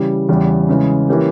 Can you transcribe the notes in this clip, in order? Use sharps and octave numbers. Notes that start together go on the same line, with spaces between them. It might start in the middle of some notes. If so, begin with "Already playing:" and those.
Already playing: C#3 E3 G3
E2 C#3 E3 G3
C#3 E3 G#3
E3 A#3 C#4 G4 A#4